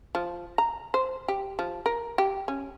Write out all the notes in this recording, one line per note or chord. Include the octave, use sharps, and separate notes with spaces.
F3
A#5
C5
G4
F3
A#4
G4
C#4